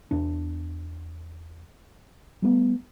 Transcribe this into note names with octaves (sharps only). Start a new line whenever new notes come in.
E2 D4
G3 A3 B3